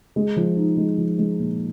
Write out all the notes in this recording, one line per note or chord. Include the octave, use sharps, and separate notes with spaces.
G#3
F3
D#4
G#3
F3
G#3
A#2